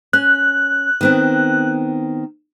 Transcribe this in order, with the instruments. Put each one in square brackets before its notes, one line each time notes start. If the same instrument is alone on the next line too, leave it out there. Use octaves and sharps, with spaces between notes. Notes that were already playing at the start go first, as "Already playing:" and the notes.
[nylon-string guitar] C#4 [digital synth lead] F#6
[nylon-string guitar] D#3 B3 C4